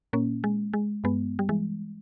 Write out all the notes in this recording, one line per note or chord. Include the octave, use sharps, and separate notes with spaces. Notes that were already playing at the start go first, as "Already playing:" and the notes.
A#2 A#3 C#4
G#3
G#3
G2 G#3 B3
G3
E3 G#3